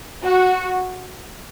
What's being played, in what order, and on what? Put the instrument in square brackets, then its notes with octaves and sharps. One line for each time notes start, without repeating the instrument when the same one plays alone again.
[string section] F#4